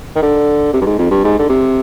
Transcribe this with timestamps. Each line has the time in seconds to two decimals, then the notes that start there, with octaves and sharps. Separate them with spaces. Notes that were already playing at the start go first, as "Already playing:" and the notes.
0.15 D#3
0.22 D3
0.73 C3
0.81 G2
0.86 G#2
0.98 F2
1.11 G2
1.24 G#2
1.39 D3
1.49 C3